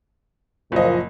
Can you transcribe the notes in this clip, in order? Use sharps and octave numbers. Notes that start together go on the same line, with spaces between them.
F#1 A#2 F3 D#5